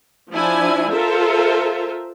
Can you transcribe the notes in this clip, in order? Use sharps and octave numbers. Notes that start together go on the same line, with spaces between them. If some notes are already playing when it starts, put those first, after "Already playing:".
F3 D4 E4 G#5
F4 A4 A#4 C5 E5